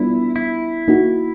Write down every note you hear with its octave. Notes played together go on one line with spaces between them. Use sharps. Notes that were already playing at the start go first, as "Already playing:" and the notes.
Already playing: G3 B3 D4 E4 F4
E4
A#3 D#4 F#4